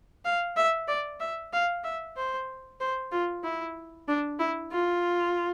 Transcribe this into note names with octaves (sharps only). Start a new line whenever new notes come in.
F5
E5
D5
E5
F5
E5
C5
C5
F4
E4
D4
E4
F4